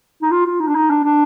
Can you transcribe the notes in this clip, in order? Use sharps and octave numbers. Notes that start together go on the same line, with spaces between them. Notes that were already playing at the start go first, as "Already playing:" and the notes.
D#4
F4
F4
D#4
D4
D#4
D4
D4